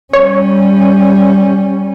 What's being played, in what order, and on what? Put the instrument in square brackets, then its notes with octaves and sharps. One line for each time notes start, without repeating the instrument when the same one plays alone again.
[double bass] G3 C#4 [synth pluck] C#5